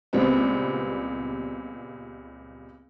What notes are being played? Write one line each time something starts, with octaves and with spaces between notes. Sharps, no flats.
C#2 A#2 G3 B3 C4